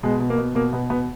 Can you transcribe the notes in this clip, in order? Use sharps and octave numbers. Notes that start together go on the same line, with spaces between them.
B2 G#3
B2
A#3
B2
B2 A#3
B2 B3
B2 B3